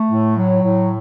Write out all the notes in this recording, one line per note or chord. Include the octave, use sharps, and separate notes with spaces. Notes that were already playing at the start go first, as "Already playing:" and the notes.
Already playing: A3
A2
F#3
A2